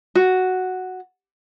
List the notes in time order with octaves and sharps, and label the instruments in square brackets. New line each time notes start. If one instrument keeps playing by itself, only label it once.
[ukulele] F#4